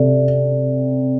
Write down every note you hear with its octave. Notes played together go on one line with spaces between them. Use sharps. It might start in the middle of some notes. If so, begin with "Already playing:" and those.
Already playing: C3 A4 D5